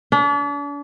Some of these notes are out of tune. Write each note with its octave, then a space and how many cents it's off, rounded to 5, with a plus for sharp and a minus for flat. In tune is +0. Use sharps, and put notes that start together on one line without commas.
D4 -40